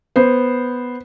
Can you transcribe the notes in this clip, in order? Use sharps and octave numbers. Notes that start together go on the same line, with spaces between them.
B3 C5